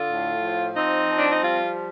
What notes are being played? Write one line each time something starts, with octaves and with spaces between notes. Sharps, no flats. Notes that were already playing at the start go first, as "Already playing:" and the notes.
Already playing: D3 F4
A2
F3
C4 D#4
F3
D4
D#4
G3 F4